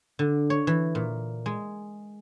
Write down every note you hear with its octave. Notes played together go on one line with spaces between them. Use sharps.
D3
C#5
E3
A#2
G#3